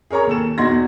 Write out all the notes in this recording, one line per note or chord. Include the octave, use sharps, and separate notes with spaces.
G#4 A#4 C#5 A#5 C#6
D#2 A4 E7
E2 D#4 F#4 C6 G#6 A#6
E2